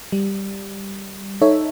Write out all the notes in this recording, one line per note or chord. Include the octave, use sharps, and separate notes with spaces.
G3
D#4 A4 C#5 E5